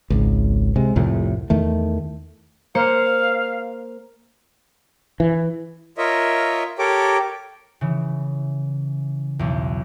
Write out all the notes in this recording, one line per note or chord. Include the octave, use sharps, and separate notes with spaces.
G#1 C#2
C3 G#3
C2 F2 A2
E2 D#3 A3
A#3 C5 F5 C#7
E3
F4 A#4 C#5 D#5 E5
G4 A4 A#4 C#5 D6
C#3 E3
B1 E2